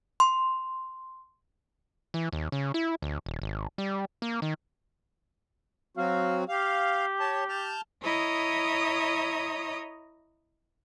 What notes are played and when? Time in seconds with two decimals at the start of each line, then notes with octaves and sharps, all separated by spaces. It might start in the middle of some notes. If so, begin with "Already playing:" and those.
0.20 C6
2.14 E3
2.33 D#2
2.52 C#3
2.74 E4
3.02 D2
3.26 D#1
3.42 G#1
3.78 G3
4.22 A#3
4.42 D#3
5.97 F#3 C4 F#4 F5
6.49 G4 F5
7.20 C#5 A5
7.49 A5 F6 G6
8.04 E4 C#5 D#5 A#5 D#6